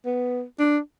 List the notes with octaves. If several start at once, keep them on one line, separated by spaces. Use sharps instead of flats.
B3
D4